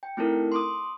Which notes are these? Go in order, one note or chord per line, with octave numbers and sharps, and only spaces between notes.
G5
A3 C4 D#4 E4 A4 A#4
C6 D6 D#6